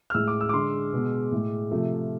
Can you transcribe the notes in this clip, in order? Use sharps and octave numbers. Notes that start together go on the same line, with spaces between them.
F6
A2 G#3 E6
D6
E6
D6
D3 G#3 C6
B2 G#3
A2 G#3
C3 F3 A3